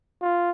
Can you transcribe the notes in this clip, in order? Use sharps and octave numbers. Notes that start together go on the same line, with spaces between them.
F4